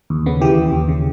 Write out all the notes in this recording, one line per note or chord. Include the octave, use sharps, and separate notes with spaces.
D#2
C#3 B3
E3 G4
D#2
D#2
C#3